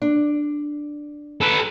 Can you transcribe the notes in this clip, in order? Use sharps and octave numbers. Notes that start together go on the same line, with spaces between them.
D4
A4 B4